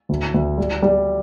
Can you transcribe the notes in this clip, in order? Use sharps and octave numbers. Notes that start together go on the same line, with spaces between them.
D2
D2
G3
G3